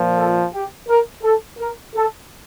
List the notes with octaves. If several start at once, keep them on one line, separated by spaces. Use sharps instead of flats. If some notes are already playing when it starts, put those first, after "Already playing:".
Already playing: A#2 F3
A4
G4
A#4
A4
A#4
A4